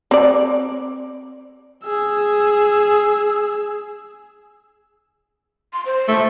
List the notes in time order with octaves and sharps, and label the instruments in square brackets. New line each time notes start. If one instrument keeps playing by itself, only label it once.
[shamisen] C4 D5
[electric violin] G#4 E6
[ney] C6
C5
[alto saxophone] A3